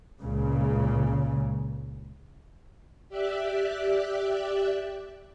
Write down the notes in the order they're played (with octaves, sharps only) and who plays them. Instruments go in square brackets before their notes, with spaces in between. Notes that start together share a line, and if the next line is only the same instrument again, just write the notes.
[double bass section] C#2 A#2 C#3
[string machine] G4 D5 E5 F#6